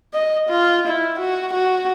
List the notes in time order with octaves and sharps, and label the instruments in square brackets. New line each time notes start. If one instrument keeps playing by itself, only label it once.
[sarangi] D#5
F4
E4
F#4
F#4